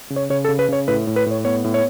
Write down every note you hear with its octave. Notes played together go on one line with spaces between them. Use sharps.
C#3
C#5
C#3 C#5
A4
C#3
B4
C#3 C#5
A2 B4
A2
B4
A2 C#5
B3 C#5
A2
C#5